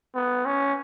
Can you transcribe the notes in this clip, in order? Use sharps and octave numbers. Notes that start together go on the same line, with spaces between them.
B3
C#4